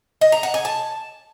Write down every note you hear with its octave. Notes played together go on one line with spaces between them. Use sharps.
D#5
A#5
F#5
G#5
A5